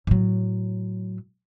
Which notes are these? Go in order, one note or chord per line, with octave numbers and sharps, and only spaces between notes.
A2 F#3